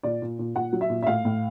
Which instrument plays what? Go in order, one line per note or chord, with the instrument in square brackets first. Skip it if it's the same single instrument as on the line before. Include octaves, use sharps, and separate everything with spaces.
[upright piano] A#2 D5
A#2
A#2
A#2 F#5
F#3
E5
A#2
E5
A2 F5
A2